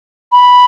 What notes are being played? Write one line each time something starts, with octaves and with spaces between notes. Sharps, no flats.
B5